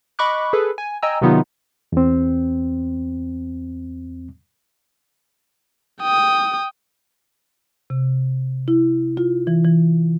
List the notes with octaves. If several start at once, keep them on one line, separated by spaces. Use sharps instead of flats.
D#5 B5 C#6 D6 F#6
G#4 A4 B4
G#5
D#5 G5 G#5 A#5 E6
C3 D#3 F#3 B3 D#4 F4
E2 C4
G5 D#6
C3
E4
F4
E3
E3